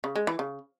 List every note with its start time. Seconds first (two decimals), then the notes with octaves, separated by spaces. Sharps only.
0.04 C#3
0.16 G#3
0.27 E3
0.39 C#3